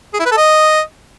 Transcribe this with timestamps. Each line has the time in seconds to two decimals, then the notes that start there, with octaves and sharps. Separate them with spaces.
0.14 G#4
0.19 E4
0.25 B4
0.31 A4
0.37 D#5